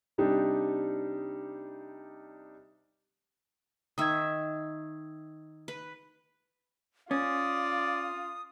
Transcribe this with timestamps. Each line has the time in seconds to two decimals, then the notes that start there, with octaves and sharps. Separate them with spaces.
0.18 C3 G3 D4 D#4 G4
3.98 D#3 E5 D#6 E6 G#6
5.68 B4
7.11 C#4 F4 D5 D#6